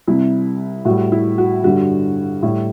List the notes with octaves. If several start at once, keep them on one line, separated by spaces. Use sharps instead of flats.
C2 C3 G3 E4
A2 G3 F#4
E4
F#4
G2 D3 G3 F#4
A2 G3 E4